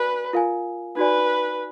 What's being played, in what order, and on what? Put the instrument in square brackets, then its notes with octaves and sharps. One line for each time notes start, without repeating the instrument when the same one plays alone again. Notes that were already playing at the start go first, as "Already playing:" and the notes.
Already playing: [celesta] F#4 D5 G#5 [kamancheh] B4
[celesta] F4 A#4 F5 G#5
[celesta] D#4 F#4 D5 G#5 [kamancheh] B4